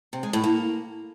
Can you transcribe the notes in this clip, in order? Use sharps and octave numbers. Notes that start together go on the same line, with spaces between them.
C3
G#3
A2
A#3